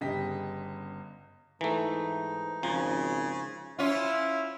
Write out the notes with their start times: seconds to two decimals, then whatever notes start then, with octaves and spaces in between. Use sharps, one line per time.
0.01 G1 C#3 G4 D#5 B6
1.61 G#2 E3 A3 D#4
2.63 G#1 C#3 F3
3.79 C#4 E4 F4